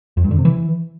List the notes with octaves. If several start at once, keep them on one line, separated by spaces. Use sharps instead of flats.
F2
G2
D3
C3
E3